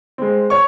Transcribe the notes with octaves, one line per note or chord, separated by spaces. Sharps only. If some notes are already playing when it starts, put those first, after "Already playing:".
G#3 C4
C#5 C#6